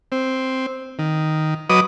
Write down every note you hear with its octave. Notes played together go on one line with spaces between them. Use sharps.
C4
D#3
F#3 B4 D#5 D6 D#6